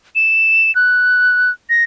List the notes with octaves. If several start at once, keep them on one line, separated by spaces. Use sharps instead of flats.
E7
F#6
A#6